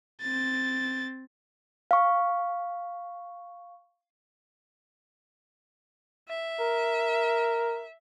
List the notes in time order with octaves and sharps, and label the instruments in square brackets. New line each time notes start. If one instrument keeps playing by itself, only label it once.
[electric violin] C4 A6
[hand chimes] F5 C#6
[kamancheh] E5
[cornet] A#4